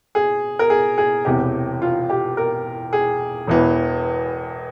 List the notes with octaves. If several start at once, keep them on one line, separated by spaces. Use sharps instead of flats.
G#4
A#4
G#4
G#4
E1 E2 C3 G4
F4
G4
A#4
G#4
E1 E2 E3